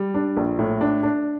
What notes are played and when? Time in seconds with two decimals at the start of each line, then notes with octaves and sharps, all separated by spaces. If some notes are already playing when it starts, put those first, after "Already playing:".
Already playing: G3
0.14 D4
0.37 A#1
0.59 A2
0.81 D4
1.03 D4